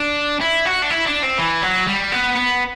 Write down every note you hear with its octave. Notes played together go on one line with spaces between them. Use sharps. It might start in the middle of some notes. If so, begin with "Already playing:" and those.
Already playing: D4
E4
F#4
D4
E4
D4
C4
E3
F#3
G3
B3
B3